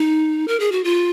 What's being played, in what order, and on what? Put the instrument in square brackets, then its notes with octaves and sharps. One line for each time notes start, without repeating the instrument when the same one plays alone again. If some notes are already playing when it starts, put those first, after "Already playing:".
Already playing: [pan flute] D#4
A#4
G#4
F#4
F4